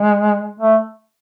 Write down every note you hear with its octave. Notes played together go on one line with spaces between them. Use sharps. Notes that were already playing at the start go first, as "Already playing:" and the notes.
Already playing: G#3
A3